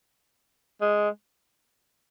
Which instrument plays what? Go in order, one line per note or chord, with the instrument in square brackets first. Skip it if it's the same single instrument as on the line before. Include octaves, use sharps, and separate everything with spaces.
[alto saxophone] G#3